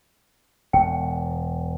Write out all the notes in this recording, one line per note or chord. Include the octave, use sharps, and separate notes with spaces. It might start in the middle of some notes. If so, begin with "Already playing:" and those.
E1 G5